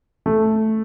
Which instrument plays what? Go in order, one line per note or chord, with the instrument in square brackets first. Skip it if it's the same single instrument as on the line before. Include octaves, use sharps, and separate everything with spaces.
[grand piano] A3